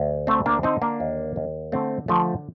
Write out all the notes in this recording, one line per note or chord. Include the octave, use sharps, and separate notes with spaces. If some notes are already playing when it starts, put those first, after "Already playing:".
Already playing: D2
D3 A3 C4
A#3 D4
D3 C4 D#4
A#3 D4
D#2
D#2
D3 A3 C4
D3 F3 A3